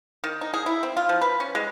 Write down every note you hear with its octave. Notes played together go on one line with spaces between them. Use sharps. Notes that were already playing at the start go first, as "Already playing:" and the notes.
D#3
D#4
G#4
E4
C4
F4
F3
B4
C#4
G#3